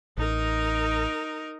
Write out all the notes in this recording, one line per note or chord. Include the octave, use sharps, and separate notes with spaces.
A1 D#4 A#4